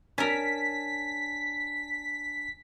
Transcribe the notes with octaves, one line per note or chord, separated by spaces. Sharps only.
C#4 D4 A#4 G#5 A5 B6